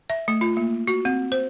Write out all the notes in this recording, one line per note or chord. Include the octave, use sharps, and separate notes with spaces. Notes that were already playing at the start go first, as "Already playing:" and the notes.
E5
A3
F4
A#3
F#4
C4
C5